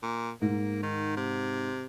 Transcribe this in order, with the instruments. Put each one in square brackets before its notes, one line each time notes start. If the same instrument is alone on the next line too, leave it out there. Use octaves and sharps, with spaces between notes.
[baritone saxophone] A#2
[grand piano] G#2 [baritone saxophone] A#3
[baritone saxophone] D#3
C3